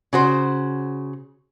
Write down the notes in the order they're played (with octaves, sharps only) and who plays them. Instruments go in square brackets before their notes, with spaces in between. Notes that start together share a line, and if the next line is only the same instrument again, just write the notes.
[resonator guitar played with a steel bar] C#3 F#4 C5